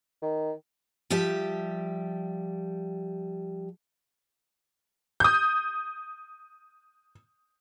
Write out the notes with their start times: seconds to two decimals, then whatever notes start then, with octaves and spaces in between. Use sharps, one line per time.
0.22 D#3
1.10 F3 G3 G4 E5
5.20 D#6 G6